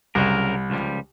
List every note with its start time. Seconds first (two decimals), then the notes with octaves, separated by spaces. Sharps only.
0.15 C2 C#3 F#3 A#4
0.70 C#2 F3 G3